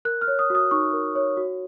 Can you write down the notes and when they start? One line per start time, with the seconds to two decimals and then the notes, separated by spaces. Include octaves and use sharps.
0.05 A#4 F#6
0.21 F6
0.28 C#5
0.39 D#6
0.50 F#4 D#6
0.71 D#4 C#6
0.93 A#4
1.16 C#5
1.37 F#4